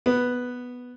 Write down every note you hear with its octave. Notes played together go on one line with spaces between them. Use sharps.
B3